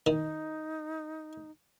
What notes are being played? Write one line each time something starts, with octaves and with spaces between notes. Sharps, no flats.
D#3 D#4